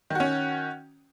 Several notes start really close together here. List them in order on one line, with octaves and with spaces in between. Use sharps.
D#3 F#4 C#4